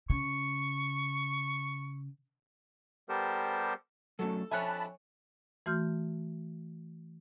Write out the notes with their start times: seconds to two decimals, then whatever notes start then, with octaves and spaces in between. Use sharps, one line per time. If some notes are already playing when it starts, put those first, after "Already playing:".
0.10 C#3 C#6
3.09 G3 B3 G4 A4 A#4 C5
4.19 F#3 A3 C#4 A4 A5
4.52 F2 D4 C#5 E5 G#5 A5 B5 F#6
5.66 E3 A3 F#4 C6 F6 G6